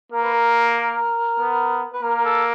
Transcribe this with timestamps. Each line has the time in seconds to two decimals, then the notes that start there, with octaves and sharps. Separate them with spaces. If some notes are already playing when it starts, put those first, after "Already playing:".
0.12 A#3 A#4
0.23 B4
0.33 A#4
1.39 B3
1.94 B4
2.03 A#3 A#4
2.25 A4